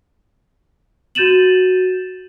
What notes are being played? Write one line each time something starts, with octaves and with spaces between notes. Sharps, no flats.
F#4 G6 A6 D#7 E7 F#7